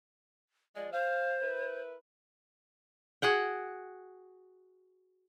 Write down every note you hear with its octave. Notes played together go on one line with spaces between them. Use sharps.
F3 G#3 D5
C5 F5
E4 A#4 B4
F#4 G#4 F#5 G5